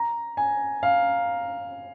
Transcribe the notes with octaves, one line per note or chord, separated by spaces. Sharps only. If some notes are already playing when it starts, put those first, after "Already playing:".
Already playing: A#5
G#5
F5